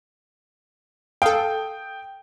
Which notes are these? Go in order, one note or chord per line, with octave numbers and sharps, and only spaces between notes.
A4 F5 G5 D#6